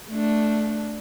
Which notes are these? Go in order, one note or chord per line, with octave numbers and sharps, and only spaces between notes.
A3 D4